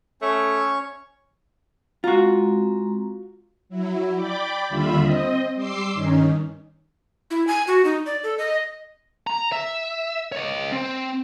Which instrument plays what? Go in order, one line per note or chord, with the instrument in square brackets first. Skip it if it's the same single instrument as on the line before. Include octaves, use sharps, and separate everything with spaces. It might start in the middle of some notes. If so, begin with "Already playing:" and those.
[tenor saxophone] A3 [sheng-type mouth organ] C#4 C#5 C#6
[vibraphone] G#3 C4 A#5 [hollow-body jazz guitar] F4 F#4
[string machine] F#3 E4
D5 G5 B5 D6
D#2 D3 G3 F4 E5 B5
C4 D#5
G3 C6 D6 E6 C7
G2 D#3 C#4 D#4
[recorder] E4
G#5
F#4
D#4
D5
A4
D#5
[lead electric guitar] A#5
E5
C#5 D#5
C4